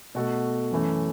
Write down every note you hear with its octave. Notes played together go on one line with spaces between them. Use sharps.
B2 A3 F#4 A4
F#2 E3 A3